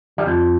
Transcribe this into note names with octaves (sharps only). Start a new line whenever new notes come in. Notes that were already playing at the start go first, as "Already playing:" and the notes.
G3
F2 F3